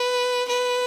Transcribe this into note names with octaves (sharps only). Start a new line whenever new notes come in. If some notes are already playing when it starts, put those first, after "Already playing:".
Already playing: B4
B4